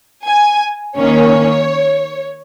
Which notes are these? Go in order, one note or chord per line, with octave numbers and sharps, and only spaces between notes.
G#5
D#3 A#3 C#4 C#5